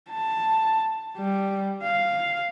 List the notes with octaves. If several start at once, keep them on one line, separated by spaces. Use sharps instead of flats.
A5
G3
F5